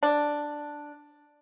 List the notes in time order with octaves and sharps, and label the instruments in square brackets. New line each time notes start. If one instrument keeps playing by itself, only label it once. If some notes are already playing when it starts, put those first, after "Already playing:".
[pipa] D4